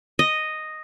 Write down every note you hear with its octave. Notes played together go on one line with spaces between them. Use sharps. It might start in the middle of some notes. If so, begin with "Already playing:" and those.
D#5